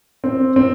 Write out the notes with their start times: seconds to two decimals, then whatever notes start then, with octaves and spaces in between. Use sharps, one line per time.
0.24 C4
0.56 C4